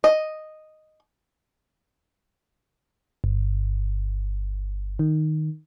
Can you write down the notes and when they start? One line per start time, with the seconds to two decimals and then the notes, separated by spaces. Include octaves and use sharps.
0.04 D#5
3.24 G1
4.99 D#3